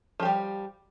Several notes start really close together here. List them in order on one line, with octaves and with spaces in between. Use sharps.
F3 G4 G3